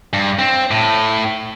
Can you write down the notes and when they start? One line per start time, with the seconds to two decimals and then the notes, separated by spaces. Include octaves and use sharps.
0.13 G2
0.39 C4
0.71 A2